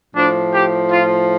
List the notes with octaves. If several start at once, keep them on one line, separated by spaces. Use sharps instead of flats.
A2 F3 D4
G4
F4